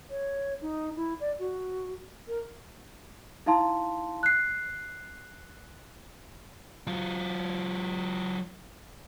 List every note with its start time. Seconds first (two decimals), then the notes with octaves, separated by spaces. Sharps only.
0.10 C#5
0.62 D#4
0.97 E4
1.20 D5
1.39 F#4
2.28 A#4
3.46 D#4 E4 F5 A5 C6
4.23 F#6 C7
6.87 F#3 F4